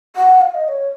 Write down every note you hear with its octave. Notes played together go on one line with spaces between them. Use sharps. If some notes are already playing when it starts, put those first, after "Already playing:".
F#5
F5
D#5
D#5
C#5